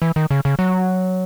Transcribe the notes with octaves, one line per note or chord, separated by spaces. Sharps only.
E3
D#3
C#3
C#3
F#3